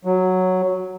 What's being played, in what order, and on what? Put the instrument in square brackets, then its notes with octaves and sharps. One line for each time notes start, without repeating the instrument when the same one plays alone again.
[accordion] F#3